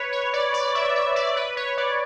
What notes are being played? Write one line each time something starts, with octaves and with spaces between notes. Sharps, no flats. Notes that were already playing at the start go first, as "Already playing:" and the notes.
Already playing: B4 C#5
C#5
D5
D5
E5
E5
D5
B4
C#5
D5